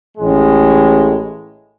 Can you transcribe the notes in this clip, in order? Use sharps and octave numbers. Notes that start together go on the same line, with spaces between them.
A1 A2 G#3